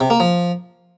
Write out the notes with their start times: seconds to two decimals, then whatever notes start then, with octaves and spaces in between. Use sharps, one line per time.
0.01 C3
0.10 A#3
0.20 F3